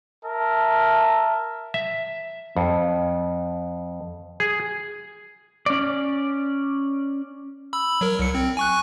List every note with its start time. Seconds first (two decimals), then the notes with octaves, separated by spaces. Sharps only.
0.24 A#4 E5 A5
1.74 E5
2.57 F2
4.40 G#4
5.66 C#4 D5
7.73 B5 E6
8.01 F#3 A#4
8.19 C2 C#7
8.35 C4
8.57 G#5 C#6 F#6